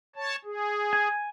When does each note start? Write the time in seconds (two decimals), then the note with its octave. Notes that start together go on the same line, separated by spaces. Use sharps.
0.16 C#5 A5
0.45 G#4
0.93 G#5